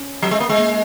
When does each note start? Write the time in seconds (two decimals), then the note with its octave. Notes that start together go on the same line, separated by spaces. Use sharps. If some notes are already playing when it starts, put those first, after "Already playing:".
Already playing: C#4
0.22 F#3
0.31 G#3
0.40 A#3
0.50 G#3
0.58 A#3